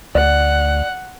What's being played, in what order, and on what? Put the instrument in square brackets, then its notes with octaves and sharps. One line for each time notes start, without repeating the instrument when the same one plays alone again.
[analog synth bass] D2 [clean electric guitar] D5 [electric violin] F#5